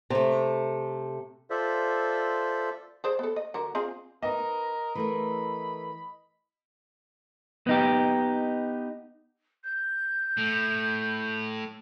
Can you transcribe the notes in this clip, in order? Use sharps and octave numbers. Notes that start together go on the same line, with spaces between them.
C3 A3
F4 A4 C5 D5 E5
G#4 C5 D5
B3 A4
D#5
D3 F#4 A#4
C4 F4 G#4
B3 D#4 A#4 D#5
E3 A3 A#4 B5
B3 D#4 G4
G6
A2